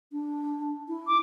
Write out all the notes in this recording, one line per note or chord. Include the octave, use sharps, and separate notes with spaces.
D4
E4
D6